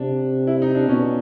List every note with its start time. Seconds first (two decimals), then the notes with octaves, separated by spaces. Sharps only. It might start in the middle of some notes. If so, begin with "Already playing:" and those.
Already playing: C3 D4
0.47 E4
0.62 D#4
0.75 D4
0.88 B2 C#4